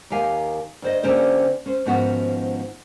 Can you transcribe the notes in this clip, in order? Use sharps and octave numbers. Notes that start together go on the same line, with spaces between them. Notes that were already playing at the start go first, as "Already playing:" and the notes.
D#2 D#3 G4 F5 G#5
D2 C5 D#5
D3 A#3 C#4 G4 C5
C#4 C5
G#2 D#3 F3 B3 C#4 F#4